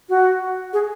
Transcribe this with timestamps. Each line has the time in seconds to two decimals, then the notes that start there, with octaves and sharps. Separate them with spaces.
0.09 F#4
0.73 G#4